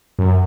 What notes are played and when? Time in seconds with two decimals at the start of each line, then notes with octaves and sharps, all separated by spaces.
0.19 F#2